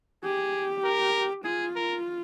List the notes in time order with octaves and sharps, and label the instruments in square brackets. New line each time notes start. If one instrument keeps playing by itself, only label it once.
[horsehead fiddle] G4 [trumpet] G#4
[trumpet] A#4
[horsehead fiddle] F4 [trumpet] G#4
[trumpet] A#4